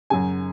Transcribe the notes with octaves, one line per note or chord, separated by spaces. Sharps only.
F#2 C#3 G#5